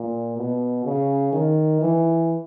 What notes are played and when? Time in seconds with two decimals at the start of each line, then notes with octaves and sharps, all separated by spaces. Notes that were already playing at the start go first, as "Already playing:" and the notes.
Already playing: A#2
0.38 B2
0.85 C#3
1.32 D#3
1.81 E3